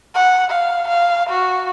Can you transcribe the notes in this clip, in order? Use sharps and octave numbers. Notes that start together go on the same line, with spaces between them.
F#5
F5
F5
F#4